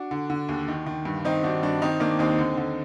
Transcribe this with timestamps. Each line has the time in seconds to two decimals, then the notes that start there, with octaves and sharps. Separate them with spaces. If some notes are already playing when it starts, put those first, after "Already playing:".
Already playing: D4 F#4
0.11 D3
0.30 D3
0.49 D#2
0.68 D#3
0.86 D#3
1.05 G2
1.25 D#3 C4 D#4
1.44 D#3 D4 F#4
1.63 G2 D4 F#4
1.82 D#3 C4 D#4
2.00 D#3 A#3 D4
2.19 D#2 C4 D#4
2.39 D3
2.57 D3